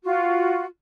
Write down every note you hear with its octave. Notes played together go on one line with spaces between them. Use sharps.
F4 F#4